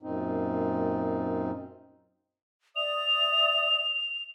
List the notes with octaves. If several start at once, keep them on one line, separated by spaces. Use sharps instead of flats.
F#2 A#2 C4 D#4
D5 E5 D#6 F7